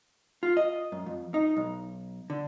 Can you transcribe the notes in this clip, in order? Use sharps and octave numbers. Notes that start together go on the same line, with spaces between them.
F4
D#5
F#2
F2
D#4
B1
D3